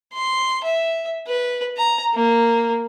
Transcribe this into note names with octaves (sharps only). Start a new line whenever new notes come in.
C6
E5
B4
A#5
A#3